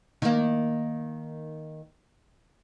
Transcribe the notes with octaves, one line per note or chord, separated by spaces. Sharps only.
D#3 A#3